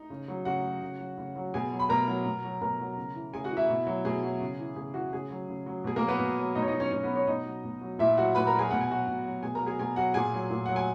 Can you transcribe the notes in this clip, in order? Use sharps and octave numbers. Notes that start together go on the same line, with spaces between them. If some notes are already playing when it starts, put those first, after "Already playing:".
Already playing: D#4
C#3
F#3
C#3 F#4 F#5
F#3
C#3
F#3
C#3
F#3
B2 G#4 G#5
F#3
B5
B2 A#4 A#5
F#3
B2
F#3
B2 A#4 A#5
F#3
C#3
E3
C#3 G#4 G#5
F#4 F#5
E3
E4 E5
B2
F#3
B2 G#4
F#3
C#3
E3
C#3 G#4
E3 F#4
C#3 G#4
F#3
C#3
F#3
B2 G#4
A#3 A#4
F#3
B3 B4
B2
F#3
B2 D#4 D#5
C#5
D#4 D#5
F#3
C#4 C#5
B2 C#4 C#5
B3 B4
F#3
C#4 C#5
B2 D#4 D#5
F#3
B2
F#3
A#2 E4 E5
F#3 F#4 F#5
A#2 B4 B5
A#4 A#5
F#3
G#4 G#5
B2 F#5
G#5
F#3 F#4 F#5
B2
F#3
B2 G#4 G#5
A#4 A#5
F#3
G#4 G#5
B2 G#4 G#5
F#3 F#4 F#5
A#2 G#4 G#5
F#3
A#2
F#3 F#5
G#5